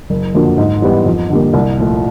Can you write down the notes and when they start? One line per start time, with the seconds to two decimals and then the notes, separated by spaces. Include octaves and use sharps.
0.10 F#1
0.35 F2 D3 F#3 A#3
0.58 G#2
0.82 E3 G3 B3
1.06 F2
1.30 D3 G3 A#3
1.54 C2
1.78 A#2 F3 A3